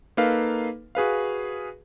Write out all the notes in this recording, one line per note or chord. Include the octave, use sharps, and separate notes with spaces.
A#3 D#4 A4 B4 F5
F#4 G#4 B4 F5